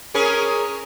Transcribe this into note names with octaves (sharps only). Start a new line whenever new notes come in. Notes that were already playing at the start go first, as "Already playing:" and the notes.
C#4 G#4 A#4